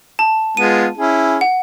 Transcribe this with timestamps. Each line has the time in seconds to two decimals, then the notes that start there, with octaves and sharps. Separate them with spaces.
0.19 A5
0.57 G#3 B3 F4 D#7
0.97 C#4 E4 G#4
1.41 F#5